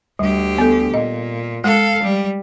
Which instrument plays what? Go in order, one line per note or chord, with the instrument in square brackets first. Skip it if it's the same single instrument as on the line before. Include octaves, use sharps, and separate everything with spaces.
[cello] D2 G4 [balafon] G3
[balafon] B3 A4
[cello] A#2 [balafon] D#5
[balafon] G#3 [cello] A4 F5
[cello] G3